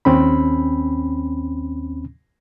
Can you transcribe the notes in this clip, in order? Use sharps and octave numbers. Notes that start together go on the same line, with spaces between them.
D#2 C4 C#4 B5